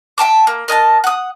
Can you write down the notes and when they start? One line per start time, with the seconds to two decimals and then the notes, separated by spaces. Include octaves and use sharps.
0.18 E5 G5 A5 D6
0.47 A#3
0.68 A#4 D#5 G#5 A5
1.04 F#5 D#6